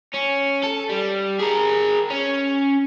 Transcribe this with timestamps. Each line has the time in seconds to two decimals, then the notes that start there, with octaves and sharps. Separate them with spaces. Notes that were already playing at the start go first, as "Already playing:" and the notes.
0.14 C#4
0.63 A4
0.89 G3
1.39 G#4 A#4
2.10 C#4